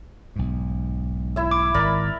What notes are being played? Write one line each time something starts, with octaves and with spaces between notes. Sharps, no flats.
B1 G#2
E4 E5
D6
G#1 A#4 D5 B5